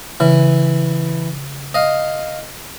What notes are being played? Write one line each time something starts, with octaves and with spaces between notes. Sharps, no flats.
C#3 E3
D#5 F5